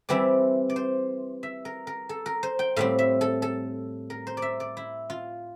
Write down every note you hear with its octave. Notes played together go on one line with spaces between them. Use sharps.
E3 G3 C4 E4 D5
D5
C5
E5
A#4
A#4
A4
A#4
C5
G5
A2 G3 C4 F5
E5
A4
A4
A#4
C5
D5
E5
D5
E4
F4